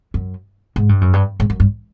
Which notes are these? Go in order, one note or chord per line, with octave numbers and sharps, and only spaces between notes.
F#2
G#2
G2
F#2
G2
G#2
F#2
G2